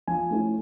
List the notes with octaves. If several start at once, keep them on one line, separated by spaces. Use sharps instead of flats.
F3 G#5
A3 C#4 E4